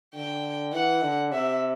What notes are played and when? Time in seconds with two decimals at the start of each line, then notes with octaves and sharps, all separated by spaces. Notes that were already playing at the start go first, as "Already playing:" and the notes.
0.14 D3 G5
0.73 E3 F#5
1.02 D3
1.32 C3 E5